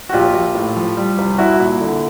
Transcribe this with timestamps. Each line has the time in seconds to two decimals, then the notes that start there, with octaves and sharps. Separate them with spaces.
0.09 F#4
0.13 A#1 F4 G4
0.33 A#1
0.55 A2
0.76 F3
0.97 G3
1.18 C2
1.38 C2 E4 F#4
1.59 A#2 E4
1.81 D3